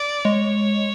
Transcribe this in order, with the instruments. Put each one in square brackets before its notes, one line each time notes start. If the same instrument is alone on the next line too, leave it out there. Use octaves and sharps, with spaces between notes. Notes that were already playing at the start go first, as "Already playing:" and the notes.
Already playing: [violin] D5
[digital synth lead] G#3 [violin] C#5